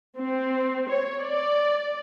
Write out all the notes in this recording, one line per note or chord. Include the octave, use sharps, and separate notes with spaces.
C4
C#5
D5